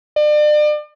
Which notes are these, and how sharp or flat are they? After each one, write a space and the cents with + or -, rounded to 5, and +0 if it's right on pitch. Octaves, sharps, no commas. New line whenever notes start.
D5 +35